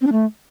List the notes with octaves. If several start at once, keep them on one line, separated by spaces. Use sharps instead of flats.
C4
D4
A3